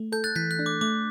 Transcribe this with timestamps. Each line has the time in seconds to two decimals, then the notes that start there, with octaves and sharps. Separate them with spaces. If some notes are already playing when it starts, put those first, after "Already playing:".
Already playing: A3
0.12 A4 G6
0.24 F#6 A6
0.35 E3 G6 B6
0.51 F#6
0.59 D4
0.66 D6
0.81 A3 D6